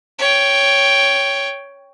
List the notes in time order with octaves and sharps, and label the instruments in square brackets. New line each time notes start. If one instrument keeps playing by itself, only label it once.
[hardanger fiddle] C#5 G5